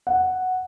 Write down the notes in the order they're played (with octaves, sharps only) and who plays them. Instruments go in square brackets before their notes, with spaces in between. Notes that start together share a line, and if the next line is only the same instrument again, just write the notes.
[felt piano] F#5